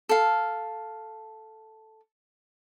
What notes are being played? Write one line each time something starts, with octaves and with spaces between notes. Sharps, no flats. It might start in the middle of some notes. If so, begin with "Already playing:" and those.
A4 F5